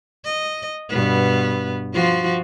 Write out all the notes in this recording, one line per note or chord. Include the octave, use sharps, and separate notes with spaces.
D#5
G2 B2 B3
F3 F4 F#4